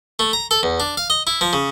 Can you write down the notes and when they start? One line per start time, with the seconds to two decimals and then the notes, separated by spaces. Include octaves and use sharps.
0.19 A3
0.33 A#5
0.51 A4
0.63 E2
0.80 D4
0.97 F5
1.10 D#5
1.27 E4
1.41 F3
1.53 C#3